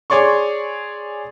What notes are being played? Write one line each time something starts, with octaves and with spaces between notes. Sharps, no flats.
G#4 C#5 D5 C6 C#6